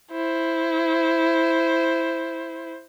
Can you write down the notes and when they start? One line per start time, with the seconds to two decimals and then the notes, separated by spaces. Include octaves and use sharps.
0.12 E4 C5